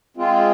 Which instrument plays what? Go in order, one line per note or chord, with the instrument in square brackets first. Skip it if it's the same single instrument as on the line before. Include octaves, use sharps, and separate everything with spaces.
[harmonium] G#3 C4 F4